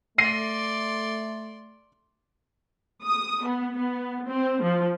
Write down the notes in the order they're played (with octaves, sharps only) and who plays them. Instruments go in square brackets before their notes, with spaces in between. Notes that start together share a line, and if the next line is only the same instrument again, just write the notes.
[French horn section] A3 [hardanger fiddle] D5 C6 [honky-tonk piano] A#6 C7 D#7
[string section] D#6
B3
B3
C4
F3